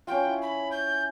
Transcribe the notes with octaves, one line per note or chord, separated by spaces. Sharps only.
C#4 F4 G5
E4
B5
G6